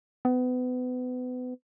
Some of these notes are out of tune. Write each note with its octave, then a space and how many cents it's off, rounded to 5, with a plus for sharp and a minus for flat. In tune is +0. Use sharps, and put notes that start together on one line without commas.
B3 +30